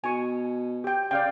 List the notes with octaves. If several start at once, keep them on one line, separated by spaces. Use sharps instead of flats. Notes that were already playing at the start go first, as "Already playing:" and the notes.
B2 G#5 C#6
G4 G5
C#3 D5 F5 G5